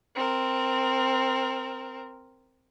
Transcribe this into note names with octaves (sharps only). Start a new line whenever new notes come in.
C4 A#4